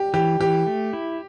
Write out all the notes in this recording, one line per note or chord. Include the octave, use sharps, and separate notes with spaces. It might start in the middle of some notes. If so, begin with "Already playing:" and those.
Already playing: G4
E3 G4
E3 G4
A3
E4